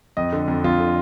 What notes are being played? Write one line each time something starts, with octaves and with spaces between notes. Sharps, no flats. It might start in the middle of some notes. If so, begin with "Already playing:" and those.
F2 D#5
D3
F2
F2 F4
D3